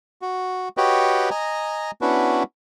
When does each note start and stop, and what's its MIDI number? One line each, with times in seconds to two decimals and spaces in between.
0.22 0.69 66
0.77 1.30 66
0.77 1.30 67
0.77 1.30 71
0.77 1.30 73
0.77 1.30 75
0.77 1.30 79
1.30 1.91 75
1.30 1.91 80
1.30 1.91 82
2.01 2.43 59
2.01 2.43 61
2.01 2.43 62
2.01 2.43 64
2.01 2.43 66
2.01 2.43 71